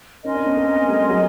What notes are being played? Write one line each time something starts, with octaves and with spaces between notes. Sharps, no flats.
C#4 D#4 A#4 D#5 G#5 C6
C4 D4
B3 C#4
A#3 C4
G3 A3
F#3 G#3